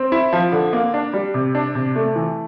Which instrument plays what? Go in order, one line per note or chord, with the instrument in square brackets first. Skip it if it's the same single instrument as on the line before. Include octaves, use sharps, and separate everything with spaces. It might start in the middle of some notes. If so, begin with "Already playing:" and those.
Already playing: [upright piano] C4
E4
F3
D3
A#3
D4
G3
C3
D4
C3
A3
E3